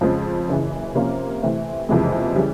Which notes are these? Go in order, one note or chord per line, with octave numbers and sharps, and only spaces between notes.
F2 C#3 F3 G#3
F#1 F#2 C#3 E3
C3 F3 A#3 C#4 F4
C3 E3 A3 C4
F#1 F2 C3 E3 G#3
C#3 E3 G3